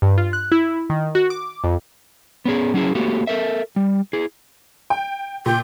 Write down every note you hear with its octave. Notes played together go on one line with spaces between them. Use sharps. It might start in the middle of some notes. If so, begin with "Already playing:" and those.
G2
F4
F#6
E4
D#3
F#4
D6
F2
B3 C#4 G#4
F#3 C#4 E4 G#4
A3 A#3 F#4 G4
A4 A#4 E5
G3
E4 G#4
G5
A#2 G5